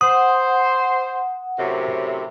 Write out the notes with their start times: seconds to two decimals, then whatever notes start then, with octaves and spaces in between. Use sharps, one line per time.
0.01 C5 F#5 D#6
1.58 F#2 A2 C3